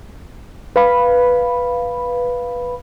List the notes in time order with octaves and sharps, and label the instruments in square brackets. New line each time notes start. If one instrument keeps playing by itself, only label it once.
[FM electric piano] B4 F5 B5